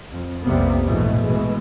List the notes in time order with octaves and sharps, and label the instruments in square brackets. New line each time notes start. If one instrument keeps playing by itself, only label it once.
[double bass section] F2
B1 F2 C3 G3 A#3 B3
A#1 G#2 B2 E3 A3
B2 E3 G#3